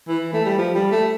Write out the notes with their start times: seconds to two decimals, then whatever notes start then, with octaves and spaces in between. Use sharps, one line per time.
0.09 E3
0.33 A3
0.46 G3
0.58 F3
0.75 G3
0.92 A3